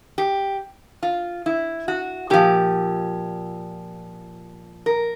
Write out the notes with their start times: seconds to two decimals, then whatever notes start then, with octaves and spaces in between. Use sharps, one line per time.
0.18 G4
1.03 F4
1.46 E4
1.88 F#4
2.30 A#2 F3 G4
4.86 A#4